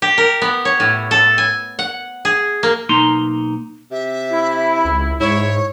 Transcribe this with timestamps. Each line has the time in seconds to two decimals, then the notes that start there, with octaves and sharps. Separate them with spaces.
0.02 G4
0.18 A#4
0.42 B3
0.65 C#5
0.80 A2
1.11 A4
1.38 G#5
1.79 F#5
2.25 G#4
2.63 A#3
2.89 B1 A#3 D#4 A#5 C6
3.91 C3 E5
4.31 E4
4.85 C#2
5.20 G#2 E4 C#5